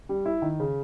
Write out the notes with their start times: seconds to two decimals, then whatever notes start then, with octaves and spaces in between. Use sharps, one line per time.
0.09 G3
0.26 E4
0.42 D#3
0.60 C#3